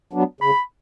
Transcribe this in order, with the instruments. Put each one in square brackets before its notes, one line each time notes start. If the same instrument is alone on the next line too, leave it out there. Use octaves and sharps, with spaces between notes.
[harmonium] F#3 B3 D4
[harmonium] C#3 [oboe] B5